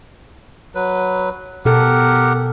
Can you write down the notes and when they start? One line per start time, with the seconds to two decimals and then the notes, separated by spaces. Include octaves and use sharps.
0.75 F#3 B4
1.65 B2 G4 A4 A#4 F#5